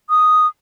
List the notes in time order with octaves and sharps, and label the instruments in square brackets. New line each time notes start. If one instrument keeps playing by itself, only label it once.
[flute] D#6